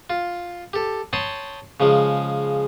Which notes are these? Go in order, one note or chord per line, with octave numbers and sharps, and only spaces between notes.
F4
G4 A4
C#5 G5 A5 B5 C6 D#6
C#3 F3 G#3